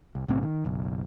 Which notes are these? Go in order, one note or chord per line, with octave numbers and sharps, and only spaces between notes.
C2
B1 A2 C#3 C4
D#3
F#1 B1